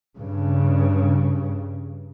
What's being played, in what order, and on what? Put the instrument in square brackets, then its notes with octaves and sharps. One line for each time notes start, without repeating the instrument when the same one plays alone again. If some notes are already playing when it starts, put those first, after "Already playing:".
[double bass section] G2 C#3